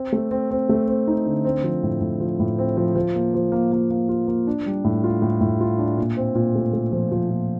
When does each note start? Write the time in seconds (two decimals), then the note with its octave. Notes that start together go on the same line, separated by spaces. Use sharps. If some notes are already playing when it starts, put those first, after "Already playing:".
Already playing: C4
0.13 A3
0.31 C4
0.51 C4
0.69 A3
0.88 C4
1.08 D#4
1.26 D3
1.45 C4
1.64 F3
1.83 A2
2.01 A2
2.20 F3
2.40 A2
2.59 C4
2.77 F3
2.95 F3
3.15 A#3
3.34 F3
3.52 A#3
3.72 A#3
3.91 A#3
4.09 F4
4.27 A#3
4.47 D4
4.66 G3
4.85 A2
5.04 F4
5.22 A2
5.41 A2
5.60 F4
5.79 D4
5.98 A#2
6.17 C4
6.35 A#2
6.55 A3
6.73 A3
6.92 F3
7.12 F3
7.30 A#2